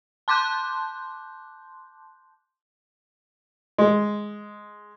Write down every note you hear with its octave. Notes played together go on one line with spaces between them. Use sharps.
A5 C6 D6 F#6 G6
G#3